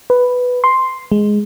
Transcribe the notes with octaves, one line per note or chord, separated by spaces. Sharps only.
B4
C6
G#3